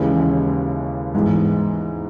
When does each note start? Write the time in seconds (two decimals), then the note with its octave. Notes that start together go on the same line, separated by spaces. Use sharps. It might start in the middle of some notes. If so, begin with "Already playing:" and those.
Already playing: D#2 C#3 E3 G#3 C#4
1.15 G#2 E3 G#3 B3